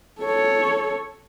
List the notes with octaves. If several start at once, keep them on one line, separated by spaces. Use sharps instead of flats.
A4 C#5